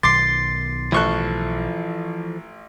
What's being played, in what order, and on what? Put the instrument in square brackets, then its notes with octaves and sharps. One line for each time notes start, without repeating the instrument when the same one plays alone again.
[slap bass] B1 D#3 [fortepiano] C6 D6 [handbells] A6 C7
[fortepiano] A1 C#6 F#6 [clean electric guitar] E3 F3 A4